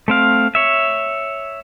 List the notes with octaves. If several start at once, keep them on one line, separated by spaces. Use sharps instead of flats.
A3 C4 F5
C#5 E5